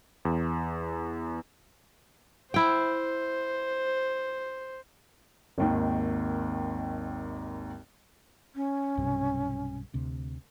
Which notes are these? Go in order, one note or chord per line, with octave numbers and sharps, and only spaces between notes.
E2
E4 C5 G5
G#1 D#2 D#3
C#4
B1 G2 C3
D2 C3